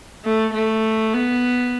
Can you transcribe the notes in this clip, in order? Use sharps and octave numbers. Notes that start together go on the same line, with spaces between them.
A3
A3
B3